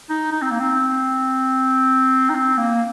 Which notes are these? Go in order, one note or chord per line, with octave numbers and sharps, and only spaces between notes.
D#4
D#4
C4
A#3
C4
D#4
C4
A#3